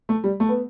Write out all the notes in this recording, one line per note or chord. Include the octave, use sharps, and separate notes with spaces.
A3
G3
A3
B3